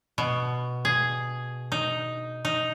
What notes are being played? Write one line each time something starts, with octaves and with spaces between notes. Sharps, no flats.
B2
G#4
D#4
D#4